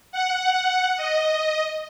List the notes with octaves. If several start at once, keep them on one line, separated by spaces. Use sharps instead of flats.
F#5
D#5